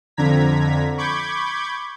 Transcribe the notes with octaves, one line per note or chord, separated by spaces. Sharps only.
F2 D3 A#5 G#6 B6
B5 C#6 D6 G6 G#6